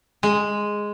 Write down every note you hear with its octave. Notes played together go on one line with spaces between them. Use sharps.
G#3